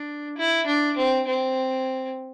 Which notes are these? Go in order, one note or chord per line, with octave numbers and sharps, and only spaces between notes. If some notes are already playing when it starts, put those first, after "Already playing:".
Already playing: D4
E4
D4
C4
C4